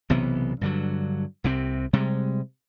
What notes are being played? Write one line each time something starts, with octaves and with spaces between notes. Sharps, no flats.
B1 C3 E3 B3
G2 D3 F#3
C2 C3 C4
C3 G3 G#3